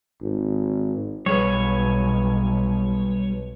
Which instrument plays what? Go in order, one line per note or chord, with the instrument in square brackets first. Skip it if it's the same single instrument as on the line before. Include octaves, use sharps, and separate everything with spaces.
[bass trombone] G#1
[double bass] B1 [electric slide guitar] G3 G#4 B4 [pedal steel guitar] C#5